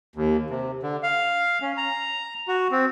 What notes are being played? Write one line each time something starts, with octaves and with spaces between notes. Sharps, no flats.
D#2
C3
D3
F5
C#4
A#5
F#4
C4